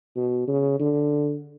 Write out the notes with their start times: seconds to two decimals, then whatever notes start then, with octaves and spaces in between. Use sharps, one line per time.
0.16 B2
0.47 C#3
0.79 D3